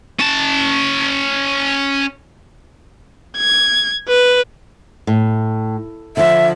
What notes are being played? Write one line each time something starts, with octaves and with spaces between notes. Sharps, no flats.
C#4 A5
G#6
B4
A2
D3 F3 E5